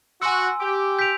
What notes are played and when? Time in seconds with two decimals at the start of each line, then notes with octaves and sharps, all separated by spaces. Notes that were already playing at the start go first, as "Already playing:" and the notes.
0.21 F#4 G#5 C6 E6
0.60 G4
0.99 G6 B6 D7 F7